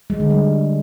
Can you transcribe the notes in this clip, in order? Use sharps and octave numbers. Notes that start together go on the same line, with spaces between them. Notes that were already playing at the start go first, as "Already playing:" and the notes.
G#3
D3
G3